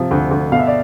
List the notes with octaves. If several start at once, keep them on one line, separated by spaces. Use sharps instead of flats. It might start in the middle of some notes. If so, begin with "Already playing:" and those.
Already playing: C3 F3
D2
D2
B2 F5
E5
D5